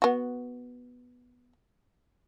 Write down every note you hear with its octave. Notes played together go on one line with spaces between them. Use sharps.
B3 F#4